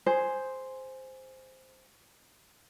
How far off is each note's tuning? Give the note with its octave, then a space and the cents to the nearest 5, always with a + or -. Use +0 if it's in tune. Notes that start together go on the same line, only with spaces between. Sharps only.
G#4 +0 C5 +0